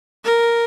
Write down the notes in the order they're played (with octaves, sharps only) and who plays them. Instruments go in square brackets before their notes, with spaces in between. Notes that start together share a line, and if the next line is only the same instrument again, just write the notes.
[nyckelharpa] A#4